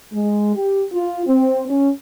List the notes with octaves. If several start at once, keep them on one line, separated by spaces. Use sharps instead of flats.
G#3
G4
F4
C4
C#4